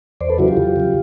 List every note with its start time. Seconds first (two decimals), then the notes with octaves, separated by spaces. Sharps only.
0.21 E2 C5 D5
0.30 A4 B4
0.38 C#3 F#3 E4 F#4
0.48 F4 G4
0.57 E2
0.76 C#3 F#3